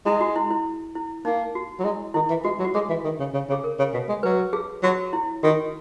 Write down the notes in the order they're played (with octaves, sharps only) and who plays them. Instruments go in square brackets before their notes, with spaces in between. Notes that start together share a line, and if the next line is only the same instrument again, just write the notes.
[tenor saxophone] G#3 [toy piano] E4
[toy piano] F#4
E4
E4
E4
[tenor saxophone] A#3 [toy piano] D#4
[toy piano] F#4
[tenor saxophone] F#3
[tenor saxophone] G#3 [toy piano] E4
[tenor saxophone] D#3 [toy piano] E4
[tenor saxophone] E3
[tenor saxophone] G#3 [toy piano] F#4
[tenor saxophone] F#3
[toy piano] F#4
[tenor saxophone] G#3 [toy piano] G#4
[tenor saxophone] E3
D#3
C#3
C#3
C#3
[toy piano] G#4
A#4
[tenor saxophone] C#3
B2
G#3
[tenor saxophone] F#3 [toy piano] B4
[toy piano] G#4
[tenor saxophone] F#3 [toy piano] F#4
[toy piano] E4
[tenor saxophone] D#3 [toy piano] F#4